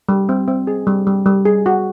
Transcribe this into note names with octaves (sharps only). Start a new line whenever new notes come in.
G3
C4
C4
G#4
G3
G3
G3
G#4
F#4